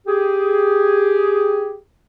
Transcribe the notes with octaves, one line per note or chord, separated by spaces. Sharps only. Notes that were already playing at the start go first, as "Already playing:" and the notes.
G4 G#4